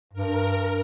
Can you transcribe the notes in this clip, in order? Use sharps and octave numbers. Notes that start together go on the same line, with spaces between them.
G2 A#4